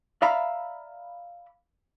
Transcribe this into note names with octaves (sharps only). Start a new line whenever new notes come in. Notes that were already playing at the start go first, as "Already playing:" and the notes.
D5 E5 F5 A#5 B5